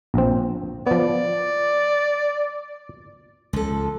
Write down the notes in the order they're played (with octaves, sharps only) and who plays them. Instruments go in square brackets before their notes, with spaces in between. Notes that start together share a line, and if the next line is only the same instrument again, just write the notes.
[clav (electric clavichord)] A#1 C4
[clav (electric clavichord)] F3 B3 [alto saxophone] D5
[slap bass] C#2 [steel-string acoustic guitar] F3 A4